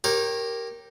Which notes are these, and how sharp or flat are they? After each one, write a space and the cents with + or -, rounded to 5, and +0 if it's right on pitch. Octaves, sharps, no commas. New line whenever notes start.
G4 +0 A#4 +0 C#5 -30